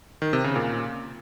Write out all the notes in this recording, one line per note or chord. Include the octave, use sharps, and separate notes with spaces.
D#3
C3
C#3
A#2